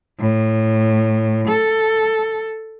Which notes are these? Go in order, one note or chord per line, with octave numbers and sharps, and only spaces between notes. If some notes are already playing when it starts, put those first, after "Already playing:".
A2
A4